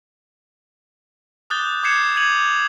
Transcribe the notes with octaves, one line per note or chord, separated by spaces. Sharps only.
D6 D#6 F#6 G6 A6 G7
D6 G6 G#6 C7 C#7 E7
G#6 C7 D#7 F7 F#7